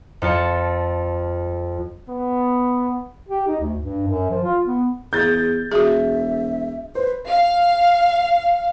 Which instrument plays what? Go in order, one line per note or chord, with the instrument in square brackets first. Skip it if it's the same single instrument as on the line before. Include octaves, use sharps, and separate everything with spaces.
[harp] F2 F4 A5 C#7
[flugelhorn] B3
[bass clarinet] G4
D#4
D2
G2
F#2
F3
F4
B3
[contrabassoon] E2 [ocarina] G#4 [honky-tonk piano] G6 A6
[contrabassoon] E1 [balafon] F#4 G#4 [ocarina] E5
[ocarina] B4 [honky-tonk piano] C5
[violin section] F5